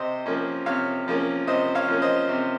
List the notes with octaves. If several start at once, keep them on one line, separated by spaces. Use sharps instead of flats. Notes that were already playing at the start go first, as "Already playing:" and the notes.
Already playing: C3 C5 D#5
F3 A#3 C#4
C3 C#5 F5
F3 A#3 C#4
C3 C5 D#5
C#5 F5
F3 A#3 C#4
C5 D#5
C3